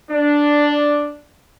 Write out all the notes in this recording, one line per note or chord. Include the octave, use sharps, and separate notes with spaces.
D4